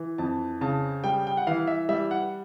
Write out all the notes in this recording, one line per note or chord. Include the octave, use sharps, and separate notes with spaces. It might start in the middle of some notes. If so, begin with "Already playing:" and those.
Already playing: E3
F2 A5
C#3 A5
G3 G5
G5
F#5
E3 F5
E5
G3 E5
F#5